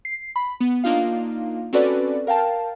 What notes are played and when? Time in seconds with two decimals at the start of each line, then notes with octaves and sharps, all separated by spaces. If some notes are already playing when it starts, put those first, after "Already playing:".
0.05 C7
0.36 B5
0.60 B3
0.84 A#3 D4 D#4 F4 F5
1.73 C4 C#4 F#4 A4 B4 D5
2.27 A#4 F5 G5 A5